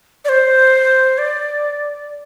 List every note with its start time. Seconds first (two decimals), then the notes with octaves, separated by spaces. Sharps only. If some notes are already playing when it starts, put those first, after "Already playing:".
0.25 D5
0.29 C5
1.18 D5